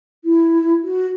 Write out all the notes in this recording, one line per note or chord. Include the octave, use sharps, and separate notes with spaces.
E4
F#4